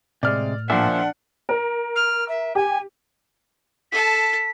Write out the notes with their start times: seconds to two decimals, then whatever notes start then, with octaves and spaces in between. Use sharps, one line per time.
0.23 A2 C3 G#3 D5 F6
0.70 A#2 F3 D4 C5 E5 F#5
1.49 A#4
1.95 F6
2.28 E5
2.55 G4 G#5
3.92 A4 A5 B6